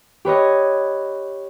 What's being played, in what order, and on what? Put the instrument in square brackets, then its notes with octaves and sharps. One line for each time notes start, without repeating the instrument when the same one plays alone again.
[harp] G4 B4 C#5 D#5